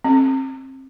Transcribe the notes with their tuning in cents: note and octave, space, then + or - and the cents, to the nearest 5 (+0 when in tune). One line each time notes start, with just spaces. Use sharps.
C4 +30